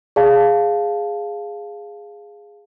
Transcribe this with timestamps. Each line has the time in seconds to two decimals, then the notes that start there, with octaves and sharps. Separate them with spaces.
0.16 G#4 D5 F5 A5